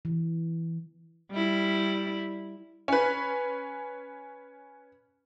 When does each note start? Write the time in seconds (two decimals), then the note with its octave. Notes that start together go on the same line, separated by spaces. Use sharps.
0.05 E3
1.31 G3 E4
2.88 C#4 B4